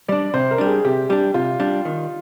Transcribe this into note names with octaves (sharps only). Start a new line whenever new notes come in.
G3 D4 D5
C3 C5
A#4
G3 D4
G#4
C3 G4
G3 D4 G4
C3 F4
G3 D4
D#3